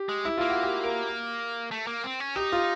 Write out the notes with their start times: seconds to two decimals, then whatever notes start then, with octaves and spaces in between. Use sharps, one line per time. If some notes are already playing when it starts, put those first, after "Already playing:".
Already playing: G4
0.09 G#3
0.25 E4
0.38 A#3 F4
0.50 F#4
0.63 G4
0.84 A#4
1.71 A3
1.87 A#3
2.04 C4
2.20 C#4
2.36 D#4 G4
2.52 F4